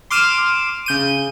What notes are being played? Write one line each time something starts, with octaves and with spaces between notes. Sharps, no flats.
C6 D6 F6 D#7 E7
C#3 G6 D#7